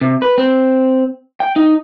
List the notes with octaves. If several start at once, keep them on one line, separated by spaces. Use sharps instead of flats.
C3
B4
C4
G5
D#4